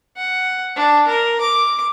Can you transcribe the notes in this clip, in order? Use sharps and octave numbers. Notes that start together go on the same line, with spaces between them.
F#5
D4
A#4
D6